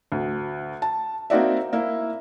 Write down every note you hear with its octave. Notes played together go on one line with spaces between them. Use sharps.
D2
A5
A#3 C4 D#4 F#4 D5 E5
A#3 E4